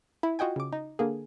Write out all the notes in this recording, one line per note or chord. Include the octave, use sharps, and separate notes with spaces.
E4
F4 F#4 D#5 G5 G#5
C#3 D6
D#4
D3 A#3 G#4